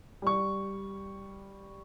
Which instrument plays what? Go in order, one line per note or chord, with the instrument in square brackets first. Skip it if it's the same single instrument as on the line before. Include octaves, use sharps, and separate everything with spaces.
[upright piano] G3 C#6